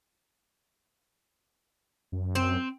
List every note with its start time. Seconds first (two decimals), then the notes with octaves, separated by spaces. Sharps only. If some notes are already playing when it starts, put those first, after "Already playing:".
2.12 F#2
2.35 C4